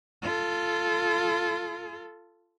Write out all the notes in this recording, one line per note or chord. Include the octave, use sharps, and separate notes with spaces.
F4 A4